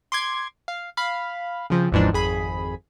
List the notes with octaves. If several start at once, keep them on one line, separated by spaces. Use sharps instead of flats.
C6 D6 G#6
F5
F5 B5
C#3 F3 C4
G#1 D#2 G#2 E3 F3 D4
G#1 F2 G#4 B5